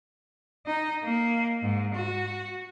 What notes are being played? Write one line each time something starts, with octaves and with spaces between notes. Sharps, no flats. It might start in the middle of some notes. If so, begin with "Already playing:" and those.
D#4
A#3
G#2
F#4